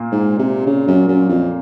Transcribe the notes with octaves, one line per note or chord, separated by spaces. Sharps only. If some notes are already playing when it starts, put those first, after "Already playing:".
Already playing: A#2 A#3
G#2
C3
C#3
F#2
F#2
F2